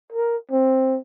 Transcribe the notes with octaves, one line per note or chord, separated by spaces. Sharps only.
A#4
C4